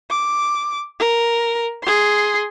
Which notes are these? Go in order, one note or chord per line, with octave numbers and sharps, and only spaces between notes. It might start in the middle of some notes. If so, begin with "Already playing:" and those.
D6
A#4
G#4 C6